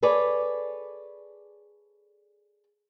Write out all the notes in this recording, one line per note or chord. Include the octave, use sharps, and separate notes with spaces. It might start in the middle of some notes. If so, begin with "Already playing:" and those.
G#4 A4 B4 C#5 D5